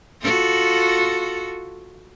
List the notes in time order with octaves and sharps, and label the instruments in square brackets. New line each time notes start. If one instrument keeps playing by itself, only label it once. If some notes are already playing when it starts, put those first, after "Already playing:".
[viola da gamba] F4 F#4 A4